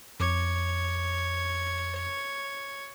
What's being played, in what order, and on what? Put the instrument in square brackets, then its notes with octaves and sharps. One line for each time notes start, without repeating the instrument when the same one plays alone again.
[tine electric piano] F2 D6 [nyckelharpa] C#5